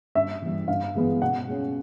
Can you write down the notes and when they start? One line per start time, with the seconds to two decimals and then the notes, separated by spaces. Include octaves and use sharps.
0.15 G2 E5
0.42 E3 G3
0.68 G2 F5
0.95 E3 G#3 B3
1.21 B2 F#5
1.48 G#3 C#4